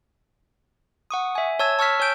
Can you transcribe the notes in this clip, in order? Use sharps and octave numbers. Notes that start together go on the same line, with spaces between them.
F#5 C#6 D#6
E5 G#5
C#5 A5 E6 G#6
A5 C#6 E6 F6 B6
C#5 G#5 G6 D7